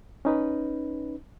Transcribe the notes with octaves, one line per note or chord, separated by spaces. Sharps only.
C#4 D#4 B4